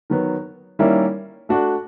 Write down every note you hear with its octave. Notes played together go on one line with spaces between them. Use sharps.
D#3 F#3 B3
D#3 G3 A#3 C#4 E4
A3 D4 F#4